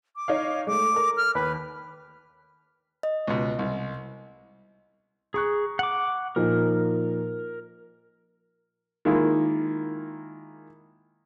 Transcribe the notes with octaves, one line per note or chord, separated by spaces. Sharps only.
D6
D#4 C#5 F5
G#3 A3 D6
A4 A#4
F6
D#2 B4
D#5
C#2 B2
C2
G#4 A#5 C#6 F#6
F#5 D6
A#2 F3 D#4 A#4
D#3 G#3 A#3 E4 F4